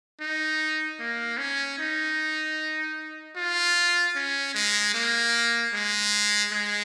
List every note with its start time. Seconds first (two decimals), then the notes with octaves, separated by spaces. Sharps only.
0.21 D#4
1.00 A#3
1.39 C#4
1.79 D#4
3.36 F4
4.16 C#4
4.55 G#3
4.94 A#3
5.74 G#3
6.52 G#3